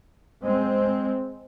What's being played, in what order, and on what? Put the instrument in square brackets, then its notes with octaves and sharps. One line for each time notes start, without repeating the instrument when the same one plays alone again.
[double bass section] G#3 C4